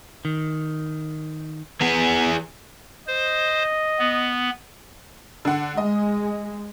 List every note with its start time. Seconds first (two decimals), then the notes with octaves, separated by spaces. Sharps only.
0.25 D#3
1.81 E3 B3 G#4
3.08 C5 D#5
3.99 B3
5.45 D3 F#5
5.77 G#3 D#5